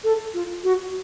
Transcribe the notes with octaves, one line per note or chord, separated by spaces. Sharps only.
A4
F4
F#4